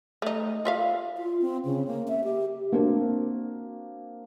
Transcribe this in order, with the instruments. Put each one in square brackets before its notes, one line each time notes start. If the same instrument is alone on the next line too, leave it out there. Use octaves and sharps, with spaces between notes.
[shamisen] A3 D#4
F4 E5 F5
[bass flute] F4
C4
C#3
A#3
E5
G4
[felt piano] A#3 C4 D4 F#4 A#4